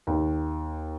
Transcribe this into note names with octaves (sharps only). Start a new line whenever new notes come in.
D#2